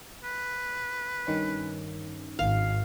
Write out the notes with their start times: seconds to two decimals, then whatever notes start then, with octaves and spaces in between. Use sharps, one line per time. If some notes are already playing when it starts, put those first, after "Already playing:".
0.24 B4
1.27 G2 D#3 C#4
2.39 G#1 F5